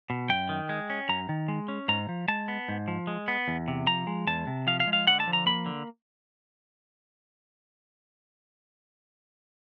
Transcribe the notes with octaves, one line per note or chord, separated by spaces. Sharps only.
B2
F#2 G5
D#3
G#3
C#4
F#2 A#5
D#3
G#3
C#4
G#2 A#5
F3
G#3 A5
B3
G#2
F3
G#3
B3
E2
C3
F3 A#5
G#3
E2 A5
C3
F3 F5
F5
G#3
F5
D3 F#5
A5
F3
A#5
A#3 B5
D3